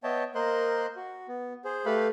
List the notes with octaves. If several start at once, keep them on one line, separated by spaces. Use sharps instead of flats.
B3 C#5 D#5 E5 G5 A5
A#3 A#4 C5 D#5 C6 F#6
F#4
B3
G#4 C5
A3 G4 A4 B4 F5 B5